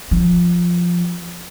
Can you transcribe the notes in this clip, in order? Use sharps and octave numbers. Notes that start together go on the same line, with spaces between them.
F3